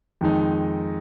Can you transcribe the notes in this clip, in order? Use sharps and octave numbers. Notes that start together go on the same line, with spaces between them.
F2 D#3 G#3 D#4